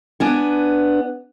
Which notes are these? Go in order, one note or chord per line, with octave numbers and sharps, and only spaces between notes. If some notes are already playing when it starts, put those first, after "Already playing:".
B3 D4 G#5